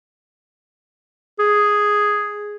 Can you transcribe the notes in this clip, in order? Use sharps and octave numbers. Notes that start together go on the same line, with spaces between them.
G#4